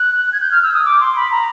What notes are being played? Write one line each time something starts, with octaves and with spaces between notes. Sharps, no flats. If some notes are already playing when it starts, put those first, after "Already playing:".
Already playing: F#6
G#6
G6
F6
E6
D#6
D6
C6
B5
A#5